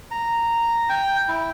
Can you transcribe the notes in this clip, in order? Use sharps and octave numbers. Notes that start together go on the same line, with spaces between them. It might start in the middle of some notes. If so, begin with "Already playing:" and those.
A#5
G5
E4